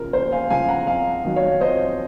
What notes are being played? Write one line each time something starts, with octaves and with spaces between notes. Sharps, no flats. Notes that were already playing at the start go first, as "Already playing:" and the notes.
Already playing: D#2 C#3 F3 A#4
D#2 C5
F5 G#5
C#3 F3 F5 G#5
F#5 A#5
F2 F5 G#5
D#3 F#3
C#5 F5
F2 C5 D#5